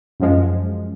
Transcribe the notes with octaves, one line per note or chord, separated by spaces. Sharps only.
F#2 F3 G#3